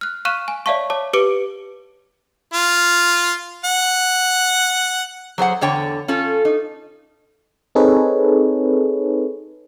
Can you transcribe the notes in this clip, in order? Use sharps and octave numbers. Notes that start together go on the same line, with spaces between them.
F6 F#6
F5 C#6 F6 F#6 D#7 E7
G#5
C#5 D5 E5 F5 A5 C#6
C#5 A5 D6
G4 B4 D6 C#7 D7
F4
F#5
F#3 G#4 C5 F#5
E2 D3 C#5 G5
C#4 F4 A4
D#4
C4 D#4 G#4 A4 B4 C#5